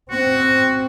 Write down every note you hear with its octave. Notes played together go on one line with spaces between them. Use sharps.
C4 F#4